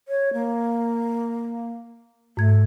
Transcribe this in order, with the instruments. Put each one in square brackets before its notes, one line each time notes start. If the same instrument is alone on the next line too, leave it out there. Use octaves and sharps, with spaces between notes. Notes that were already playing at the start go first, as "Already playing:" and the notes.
[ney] C#5
A#3
[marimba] G#2 G#6 [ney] A3